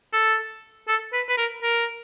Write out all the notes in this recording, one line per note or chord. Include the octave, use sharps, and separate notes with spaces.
A4
A4
B4
B4
A#4
A#4